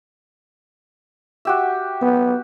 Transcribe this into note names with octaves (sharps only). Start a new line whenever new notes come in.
F#4 G4 E5
B3